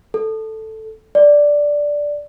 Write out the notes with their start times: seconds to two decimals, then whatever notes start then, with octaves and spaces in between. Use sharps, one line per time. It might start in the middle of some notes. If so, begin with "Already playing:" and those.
0.14 A4
1.15 D5